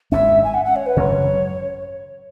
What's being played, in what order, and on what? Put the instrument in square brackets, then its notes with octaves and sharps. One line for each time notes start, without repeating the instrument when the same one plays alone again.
[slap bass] G#1 G#2 G#3 C#4 [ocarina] E5
[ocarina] G#5
F#5
F#5
C#5
B4
[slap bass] G#1 F#2 C#3 F#3 [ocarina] C#5